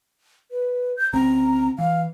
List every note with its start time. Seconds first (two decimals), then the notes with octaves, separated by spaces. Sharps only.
0.51 B4
0.97 G6
1.13 C2 C#3 C4 A#5
1.78 E3 F5